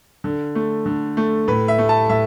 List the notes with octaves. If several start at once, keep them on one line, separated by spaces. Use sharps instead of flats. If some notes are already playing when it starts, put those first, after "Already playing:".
D3
A3
D3
A3
A2 B4
E5
A3
A5
A2 E5